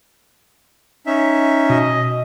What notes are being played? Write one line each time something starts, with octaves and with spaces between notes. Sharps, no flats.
C#4 D#4 E5
B2 D#5